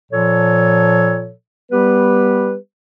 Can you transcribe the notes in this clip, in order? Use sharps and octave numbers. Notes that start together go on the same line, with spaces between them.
A#2 F3 A4 C#5
G3 B3 G4 B4